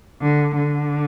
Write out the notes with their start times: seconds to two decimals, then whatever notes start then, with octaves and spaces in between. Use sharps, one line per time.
0.22 D3
0.55 D3